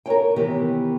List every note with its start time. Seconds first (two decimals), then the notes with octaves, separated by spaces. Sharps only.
0.06 A#4 B4 C#5 G5
0.36 C3 D#3 E3 B3 G4